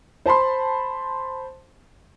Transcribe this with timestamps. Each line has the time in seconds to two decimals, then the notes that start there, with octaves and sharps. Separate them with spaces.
0.26 C5 A5 B5 C6